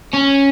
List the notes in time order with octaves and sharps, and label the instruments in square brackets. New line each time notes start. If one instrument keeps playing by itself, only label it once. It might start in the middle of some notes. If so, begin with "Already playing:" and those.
[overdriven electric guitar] C#4